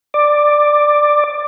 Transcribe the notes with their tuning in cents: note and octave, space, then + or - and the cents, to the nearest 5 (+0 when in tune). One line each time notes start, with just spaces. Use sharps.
D5 +10